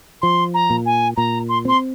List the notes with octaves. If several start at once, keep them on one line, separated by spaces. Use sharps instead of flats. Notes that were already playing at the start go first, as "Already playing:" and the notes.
F3 C6
A#5
A#2
G#5
A#2 A#5
C6
C4 C6